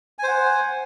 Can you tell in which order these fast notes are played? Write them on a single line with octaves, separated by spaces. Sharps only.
G#5 C5 F#5